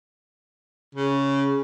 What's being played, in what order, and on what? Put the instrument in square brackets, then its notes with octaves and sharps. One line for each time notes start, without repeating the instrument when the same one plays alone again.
[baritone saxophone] C#3